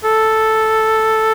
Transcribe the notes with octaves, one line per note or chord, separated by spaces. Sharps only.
A4